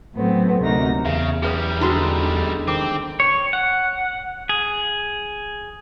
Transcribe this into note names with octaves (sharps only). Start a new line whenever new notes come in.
A2 F#3 A3 B3 C4
D2 C3 D#4 F#4 A#4 A#6
E2 C#3 E5
F#2 G3 G#4 B4 D#6
D3 G#3 D#4 E4 F#4 A4
D#3 C4 D6
C#5
F#5
G#4